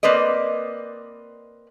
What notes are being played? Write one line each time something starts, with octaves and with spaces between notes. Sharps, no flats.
A#3 C4 B4 D5 D#5